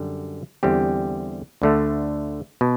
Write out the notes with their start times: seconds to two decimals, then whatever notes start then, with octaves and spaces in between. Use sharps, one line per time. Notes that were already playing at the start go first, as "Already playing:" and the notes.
Already playing: F#2 D3 G3
0.63 E2 D3 G3 C4 G4
1.62 D2 D3 A3
2.61 B2